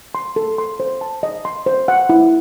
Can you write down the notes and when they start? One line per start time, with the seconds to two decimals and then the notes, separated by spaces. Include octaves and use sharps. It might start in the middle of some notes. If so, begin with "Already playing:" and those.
0.15 C6
0.36 A4
0.58 C6
0.80 C5
1.01 A5
1.23 D#5
1.45 C6
1.66 C5
1.88 F#5
2.09 E4